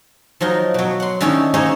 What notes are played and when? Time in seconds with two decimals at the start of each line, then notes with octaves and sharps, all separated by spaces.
0.40 F3 F#3 D#4 A#4
0.74 B2 F#3
1.00 F#5 C6
1.21 D3 D#3 C#4 D#4 E4
1.54 A#3 D#4 G#4 C#5 D#5 E5